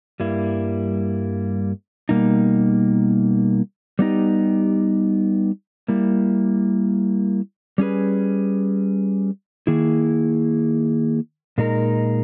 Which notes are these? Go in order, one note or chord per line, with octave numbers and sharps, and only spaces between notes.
G2 G3 A#3 E4
B2 G3 A#3 D#4
G3 B3 D#4 G4
G3 A#3 E4
G3 C#4 G#4 B4
D#3 A#3 E4 G#4
A#2 G#3 D#4 A#4